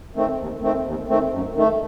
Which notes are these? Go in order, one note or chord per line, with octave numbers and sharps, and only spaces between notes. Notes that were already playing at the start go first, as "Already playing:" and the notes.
D#3 A3 C4
D#2
D#3 A3 C4
D#2
D#3 A3 C4
F#2
D#3 A3